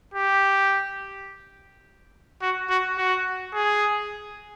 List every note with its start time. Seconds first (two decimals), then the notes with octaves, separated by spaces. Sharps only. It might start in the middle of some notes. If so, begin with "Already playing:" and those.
0.14 G4
2.42 F#4
2.69 F#4
2.98 F#4
3.54 G#4